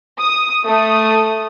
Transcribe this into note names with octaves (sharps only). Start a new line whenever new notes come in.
D#6
A3 D#6